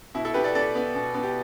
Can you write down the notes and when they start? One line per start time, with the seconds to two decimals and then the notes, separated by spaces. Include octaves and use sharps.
0.15 B2 E4
0.25 E4 A4
0.34 B3 G4 B4
0.44 A4 D5
0.55 B2 A4 D5
0.75 B3
0.95 B2
1.14 B3
1.23 G4